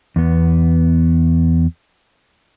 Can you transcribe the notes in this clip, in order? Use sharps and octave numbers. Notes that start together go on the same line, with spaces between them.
E2 B3